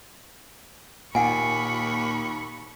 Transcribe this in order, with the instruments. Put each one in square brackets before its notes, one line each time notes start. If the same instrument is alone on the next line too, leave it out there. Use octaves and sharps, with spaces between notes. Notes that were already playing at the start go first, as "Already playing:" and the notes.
[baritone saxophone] D#2 [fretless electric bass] A#2 [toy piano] F#5 G#5 [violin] B5 C#6